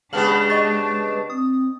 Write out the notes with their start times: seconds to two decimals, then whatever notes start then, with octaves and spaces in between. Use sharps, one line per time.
0.13 C#3 G#3 B3 D4 G4 A5 F6 F#7
0.50 D#5 C#6 A6
1.30 C4 D#6